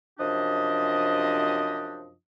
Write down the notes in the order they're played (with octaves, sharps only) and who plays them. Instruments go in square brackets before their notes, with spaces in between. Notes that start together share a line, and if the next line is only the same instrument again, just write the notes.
[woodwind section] F#2 C3 F3 D4 G4 D#5